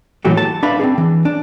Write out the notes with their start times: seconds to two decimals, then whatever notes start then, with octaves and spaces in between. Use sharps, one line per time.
0.25 A#2 E3 F#3 A3 F#4 G4
0.37 A5
0.63 D4 B4 E5 F5 B5
0.80 C4 D4 G#4
0.98 E3
1.25 D4